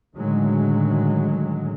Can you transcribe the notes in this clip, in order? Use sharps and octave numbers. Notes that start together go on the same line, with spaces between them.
A2 D3 D#3 F#3 G#3